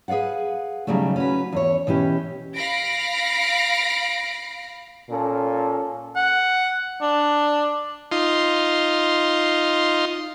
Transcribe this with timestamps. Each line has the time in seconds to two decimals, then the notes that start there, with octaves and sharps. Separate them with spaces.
0.08 G#4 B4 D5 F5 F#5
0.87 D#2 C#3 F#3 G3 A3
1.16 C#4 F#4 B4
1.52 E2 F#4 C#5
1.87 B2 E3 C#4 G4
2.56 F5 B5 A#6 C7 D7
5.10 A#2 C#4 A4
6.16 F#5
7.02 D4
8.11 D#4 F4 C6